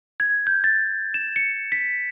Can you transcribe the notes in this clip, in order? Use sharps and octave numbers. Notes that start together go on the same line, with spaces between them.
G#6
G6
A6
E7
C#7
B6